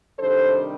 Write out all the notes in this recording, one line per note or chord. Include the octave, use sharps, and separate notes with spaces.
C3 D#3 G3 D4 A4 C5